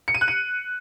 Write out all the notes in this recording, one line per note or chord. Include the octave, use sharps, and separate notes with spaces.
C#7
D#7
F#6
D#7